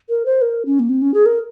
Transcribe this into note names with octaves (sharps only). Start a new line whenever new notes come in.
A#4
C5
A#4
C#4
A#3
C4
C#4
G#4
A#4